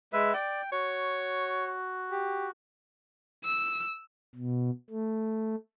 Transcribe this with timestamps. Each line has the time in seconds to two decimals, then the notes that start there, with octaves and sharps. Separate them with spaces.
0.13 G#3 B4 E5
0.34 D5 G5
0.72 F#4 C#5
2.11 G4
3.44 E6
4.36 B2
4.90 A3